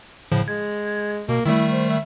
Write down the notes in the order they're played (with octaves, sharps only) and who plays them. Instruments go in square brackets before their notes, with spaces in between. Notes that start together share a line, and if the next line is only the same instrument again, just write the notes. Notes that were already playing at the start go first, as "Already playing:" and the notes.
[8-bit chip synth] A2 C#3 F3
[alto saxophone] G#3 [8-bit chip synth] G#6
[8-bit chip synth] B2 [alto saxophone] A#3
[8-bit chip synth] D#3 G3 A3 [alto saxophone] E4
[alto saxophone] C5
E5